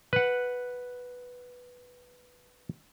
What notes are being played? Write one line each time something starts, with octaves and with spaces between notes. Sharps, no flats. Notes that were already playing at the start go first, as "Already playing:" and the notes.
B4 F#5